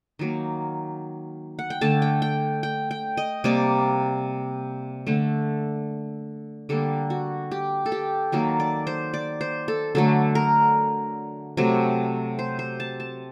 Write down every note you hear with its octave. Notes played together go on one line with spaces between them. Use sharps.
D#3 F#3 A#3
F#5
G5
D3 A3 A5
G5
G5
G5
G5
D#5
C3 G3 A#3 D5
D3 A3
D3 G3 A#3 A4
F#4
G4
A4
G4
D#3 F#3 A#3 A4
D5
C5
D5
C5
A4
D3 F#3 A3 A4
A#4
C3 F#3 A3
C5
C5
A5
A5